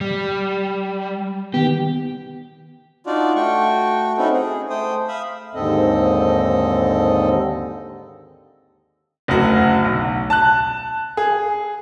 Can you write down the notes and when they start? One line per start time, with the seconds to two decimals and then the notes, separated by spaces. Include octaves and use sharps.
0.01 G3
1.54 D#3 B3 G4
3.06 D4 D#4 F4 F#4 D5
3.36 A3 F#4 G5 C#6
4.17 C4 C#4 D#4 E4 F#4 A4
4.33 G#4
4.70 A3 C5 G5 D#6
5.08 E5 F5 B5 D#6 E6
5.55 D#2 G#2 D3 C4 A4 D#5
9.28 F#1 D2 F#4
9.84 B1
10.30 A5 F#6
11.17 G#4